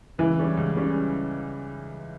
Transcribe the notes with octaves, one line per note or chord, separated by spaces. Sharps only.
C#2 E3
C#3 G3 C#4
C#2
C#3 G3 C#4